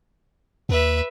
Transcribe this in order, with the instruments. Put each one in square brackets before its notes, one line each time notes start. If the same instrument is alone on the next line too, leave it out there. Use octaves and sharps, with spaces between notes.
[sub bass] D#2 [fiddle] B4 E5